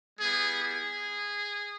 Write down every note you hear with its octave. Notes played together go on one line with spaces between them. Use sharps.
G3 B3 E4 G#4
G#4